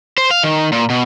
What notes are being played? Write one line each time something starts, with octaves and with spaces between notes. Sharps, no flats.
C5
F5
D#3
A#2
B2